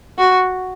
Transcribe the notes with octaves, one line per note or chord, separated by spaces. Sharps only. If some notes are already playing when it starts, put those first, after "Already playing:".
F#4